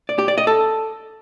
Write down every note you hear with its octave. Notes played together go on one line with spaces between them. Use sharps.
D5
G4
D5
D#5
A4